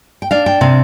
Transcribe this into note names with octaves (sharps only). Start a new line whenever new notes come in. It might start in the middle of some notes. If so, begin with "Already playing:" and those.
G5
D4 F5
G5
C3 F5